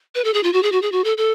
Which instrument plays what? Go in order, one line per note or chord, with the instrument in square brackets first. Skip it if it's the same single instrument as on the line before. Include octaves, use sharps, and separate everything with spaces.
[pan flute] B4
A4
G#4
F4
F#4
G#4
F#4
G#4
F#4
A4
A4